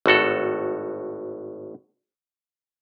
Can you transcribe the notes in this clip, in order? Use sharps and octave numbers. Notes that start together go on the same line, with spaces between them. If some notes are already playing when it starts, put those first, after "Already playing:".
G#1 A2 F#4 A4